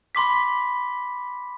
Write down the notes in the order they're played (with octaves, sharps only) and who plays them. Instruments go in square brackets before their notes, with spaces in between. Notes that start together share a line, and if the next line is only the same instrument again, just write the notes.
[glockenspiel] B5 C6 D6 B6